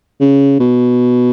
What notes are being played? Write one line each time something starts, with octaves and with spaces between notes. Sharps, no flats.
C#3
B2